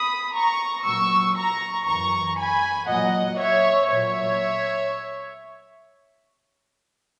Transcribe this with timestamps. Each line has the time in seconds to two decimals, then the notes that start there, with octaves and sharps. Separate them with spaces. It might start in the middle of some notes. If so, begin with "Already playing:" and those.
Already playing: B5 D#6
0.35 A#5 C#6
0.85 A#2 F#3 C#6 E6
1.36 A#5 C#6
1.86 F#2 E3 A#5 C#6
2.37 G#5 B5
2.89 A#2 F#3 D#5 F#5
3.39 C#5 E5
3.90 A#2 F#3 C#5 E5